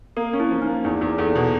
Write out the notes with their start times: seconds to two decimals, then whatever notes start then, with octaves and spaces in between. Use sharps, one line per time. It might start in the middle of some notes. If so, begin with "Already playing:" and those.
0.16 A#3 A#4
0.33 C#4
0.40 E4
0.51 F3
0.62 D#4
0.67 A#3
0.84 E2 D#4
1.01 E2
1.18 E2 A4
1.35 B2